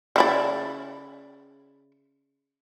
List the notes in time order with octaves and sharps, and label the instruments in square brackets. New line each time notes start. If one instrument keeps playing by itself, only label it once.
[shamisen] C#3 E4 D5